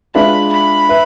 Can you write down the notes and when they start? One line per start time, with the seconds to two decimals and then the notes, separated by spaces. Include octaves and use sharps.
0.15 G#3 D4 F4 B4 E5 B5
0.53 B5
0.89 B4 E5